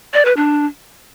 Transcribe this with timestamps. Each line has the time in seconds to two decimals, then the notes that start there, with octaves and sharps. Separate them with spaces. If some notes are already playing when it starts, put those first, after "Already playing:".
0.14 D5
0.25 B4
0.37 D4